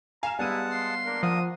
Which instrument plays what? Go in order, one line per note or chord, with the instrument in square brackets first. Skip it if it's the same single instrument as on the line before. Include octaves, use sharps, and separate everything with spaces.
[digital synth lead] F5 [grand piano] G#5 E7 [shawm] A#5
[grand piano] G3 B3 D#7 [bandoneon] G#3 F#5 A5 [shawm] E4
[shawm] C6
[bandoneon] A#3 D4 A#4
[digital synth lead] F3 [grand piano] F#5 [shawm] D#6